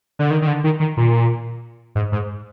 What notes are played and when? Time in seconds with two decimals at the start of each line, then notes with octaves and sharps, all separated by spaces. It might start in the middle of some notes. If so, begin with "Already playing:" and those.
0.19 D3
0.30 D#3
0.42 D#3
0.47 D3
0.64 D#3
0.80 D#3
0.97 A#2
1.95 G#2
2.12 G#2